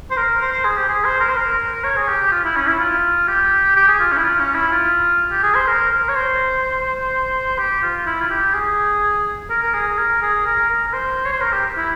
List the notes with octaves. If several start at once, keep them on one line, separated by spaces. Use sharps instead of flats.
C5
A#4
C5
C5
G#4
G4
G#4
C5
A#4
C5
A#4
C#5
G#4
G4
G4
F4
E4
C#4
E4
F4
G4
G4
G#4
F4
C#4
E4
F4
C#4
E4
F4
G4
G#4
C5
A#4
A#4
C#5
C5
G4
F4
E4
F4
G4
G#4
A#4
A#4
G#4
A#4
G#4
A#4
A#4
A#4
C5
C#5
C5
A#4
G4
E4